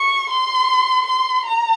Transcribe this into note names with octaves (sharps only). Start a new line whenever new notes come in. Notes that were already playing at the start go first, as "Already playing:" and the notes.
Already playing: C#6
C6
C6
A#5